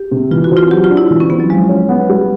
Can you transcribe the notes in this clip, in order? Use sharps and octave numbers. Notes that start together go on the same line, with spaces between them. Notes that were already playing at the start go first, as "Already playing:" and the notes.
Already playing: G4
C3
E3 F4
F#4
C4
F4
F#3 G4
F4
D4
E4
E3
C#4
B3 C4
F#3
F3 G#3
C#4
B3
G3